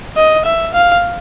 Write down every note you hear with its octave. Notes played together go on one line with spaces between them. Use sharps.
D#5
E5
F5